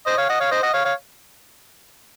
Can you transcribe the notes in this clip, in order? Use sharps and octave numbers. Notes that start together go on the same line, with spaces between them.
C5 D#5
C#5 F5
D#5 F#5
C#5 F5
C5 D#5
D#5 F#5
C#5 F5
C#5 F5